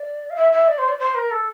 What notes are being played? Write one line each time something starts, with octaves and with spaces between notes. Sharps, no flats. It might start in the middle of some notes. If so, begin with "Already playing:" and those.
Already playing: D5
F5
E5
E5
D5
C5
D5
C5
A#4
A4